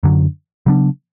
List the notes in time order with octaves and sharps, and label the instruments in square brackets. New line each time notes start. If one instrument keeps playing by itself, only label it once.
[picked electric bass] F#2 D3 F#3
C#3 F#3 B3 D4